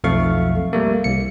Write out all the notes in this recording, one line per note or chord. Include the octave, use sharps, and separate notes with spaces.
B1 F2 A3 F5 C#6
G3 A3 A#3
C2 C#7